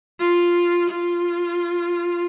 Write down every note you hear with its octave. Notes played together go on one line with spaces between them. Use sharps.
F4
F4